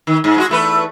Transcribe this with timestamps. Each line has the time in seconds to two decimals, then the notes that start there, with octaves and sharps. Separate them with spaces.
0.07 D#3
0.24 G#2
0.36 G#3 F4 F#4
0.49 E2 A3 B4